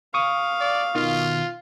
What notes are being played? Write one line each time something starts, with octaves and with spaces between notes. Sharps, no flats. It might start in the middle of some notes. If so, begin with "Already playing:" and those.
F5 C#6 D#6
D5
B2 D#3 F4